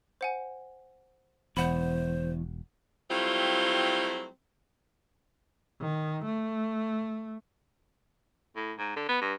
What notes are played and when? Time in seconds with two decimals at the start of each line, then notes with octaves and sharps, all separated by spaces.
0.21 C5 F#5 G#5
1.57 E1 E2 C5 F#5 B5
3.10 F#3 G3 A3 C4 E4 F4
5.81 D#3
6.25 A3
8.56 A2
8.78 G#2
8.96 D3
9.09 B3
9.21 G2